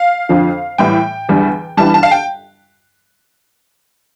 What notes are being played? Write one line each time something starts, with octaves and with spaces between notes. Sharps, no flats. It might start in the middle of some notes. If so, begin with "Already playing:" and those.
Already playing: F5
F2 D3 F3
A2 E3 G3 G5
E2 D3 G3
G2 E3 G3 A5
A5
F5
G5